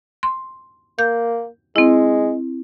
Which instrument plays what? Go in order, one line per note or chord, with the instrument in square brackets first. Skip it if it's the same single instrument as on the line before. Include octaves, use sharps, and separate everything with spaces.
[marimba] C6
[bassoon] A#3 [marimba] G6
[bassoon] G#3 [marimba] C4 E4